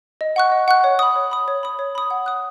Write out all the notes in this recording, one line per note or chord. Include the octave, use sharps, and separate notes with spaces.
D#5
F#5 C#6 F#6
D#5
F#5 C#6 F#6
C#5
B5 D#6
C#5
B5 D#6
C#5
B5 D#6
C#5
B5 D#6
F#5
D#6 F#6